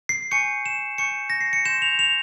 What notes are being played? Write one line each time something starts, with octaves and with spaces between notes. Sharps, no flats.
C7
G#5 C#6 G6 C#7
E7
G#5 C#6 G6 C#7
A#6
C7
C#7
C6 G6 E7
F7
F7